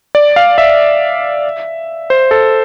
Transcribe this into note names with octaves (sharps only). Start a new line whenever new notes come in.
D5
F5
E5
C5
A4